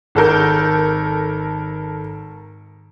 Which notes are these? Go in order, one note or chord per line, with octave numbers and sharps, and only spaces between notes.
G#1 A4 A#4 G6